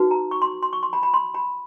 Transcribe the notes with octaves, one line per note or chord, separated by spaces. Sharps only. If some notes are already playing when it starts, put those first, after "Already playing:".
Already playing: D#4 F#4 B4
A#5
C#6
C6
C6
C#6
C6
B5
B5
C6
B5